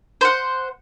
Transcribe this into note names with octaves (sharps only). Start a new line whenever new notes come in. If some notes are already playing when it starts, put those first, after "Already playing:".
C5 F#5